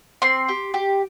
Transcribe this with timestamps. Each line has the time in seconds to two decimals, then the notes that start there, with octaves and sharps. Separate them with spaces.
0.22 C4 C6
0.48 G4
0.74 G4